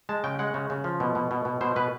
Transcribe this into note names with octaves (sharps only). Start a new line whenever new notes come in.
G#3 A5
C#3 G5
G#3 F#5
C#3
C#3
F3
B2
B2
B2
B2
B2 C5
B2 B4